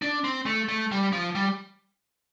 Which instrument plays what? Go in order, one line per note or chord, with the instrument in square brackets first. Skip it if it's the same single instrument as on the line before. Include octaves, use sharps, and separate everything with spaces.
[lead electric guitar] D4
C4
A3
A3
G3
F3
G3